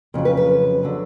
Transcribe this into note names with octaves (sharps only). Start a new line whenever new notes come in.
F2 C#3 F#3
B4
B4
D3 F#3